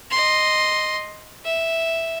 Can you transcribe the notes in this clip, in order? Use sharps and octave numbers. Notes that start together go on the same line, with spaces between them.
D#5 C6
E5